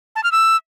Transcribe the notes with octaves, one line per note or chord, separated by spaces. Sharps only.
A5
F6
E6